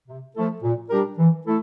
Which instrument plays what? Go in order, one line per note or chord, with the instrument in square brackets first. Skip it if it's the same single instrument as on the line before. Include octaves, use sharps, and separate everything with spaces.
[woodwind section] C3
F3 A3 E4 A4
A#2
G3 D4 G4 A#4
E3
A3 E4 A4